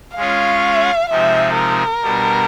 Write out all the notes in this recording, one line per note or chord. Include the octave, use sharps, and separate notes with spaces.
G#3 C#4 F4 G#4 C#5 F5
C3 F3 G#3 C4 D#4 E5
A#4
B2 G3 B3 D4